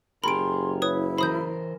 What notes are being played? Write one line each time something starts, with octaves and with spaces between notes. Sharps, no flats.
F#1 G4 G#4 A#4 B5 C6 D7
E4 B4 C#5 D#6
E3 A#4 C5 B5 D#6 G6